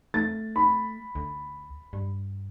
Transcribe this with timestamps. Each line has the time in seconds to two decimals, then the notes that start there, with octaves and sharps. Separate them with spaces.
0.14 A3 A6
0.56 B5
1.15 D2
1.93 G2